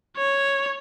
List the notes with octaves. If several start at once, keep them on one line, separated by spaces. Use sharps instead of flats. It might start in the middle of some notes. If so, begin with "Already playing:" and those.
C#5